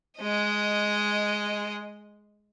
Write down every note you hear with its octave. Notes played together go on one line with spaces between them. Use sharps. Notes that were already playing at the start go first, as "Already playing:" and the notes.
G#3 D#5